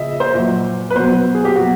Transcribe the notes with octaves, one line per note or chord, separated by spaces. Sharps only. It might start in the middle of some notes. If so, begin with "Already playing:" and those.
Already playing: C#3 F3 D#5 E5
C5
A#2 F#3
B4
B2 F#3 C5
G#4
G4
B2 F#3 F#4